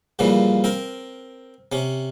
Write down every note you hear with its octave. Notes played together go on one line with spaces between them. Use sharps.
G2 A#2 C#3 E3 F3
C4 A#4
C3 C#4